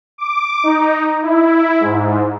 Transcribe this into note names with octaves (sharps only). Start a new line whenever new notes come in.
D6
D#4
E4
G#2